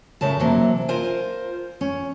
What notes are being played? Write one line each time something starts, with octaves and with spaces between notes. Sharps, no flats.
A2 C#3 A#4 A5
C3 E3 F#3 A#3
F4 A#4 C5 G#5
C#4